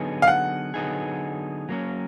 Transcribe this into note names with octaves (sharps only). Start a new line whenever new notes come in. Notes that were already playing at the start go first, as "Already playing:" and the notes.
Already playing: D3 F#3 B3 D#4 G#4
F5
F#5
D3 F#3 B3 D#4 G#4
F#3 A#3 C#4